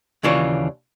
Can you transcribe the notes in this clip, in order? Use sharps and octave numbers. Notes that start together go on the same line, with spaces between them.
D#2 C#3 E3 D4 F4 C#5